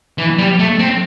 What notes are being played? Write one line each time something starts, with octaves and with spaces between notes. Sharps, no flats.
E3
G3
A3
C4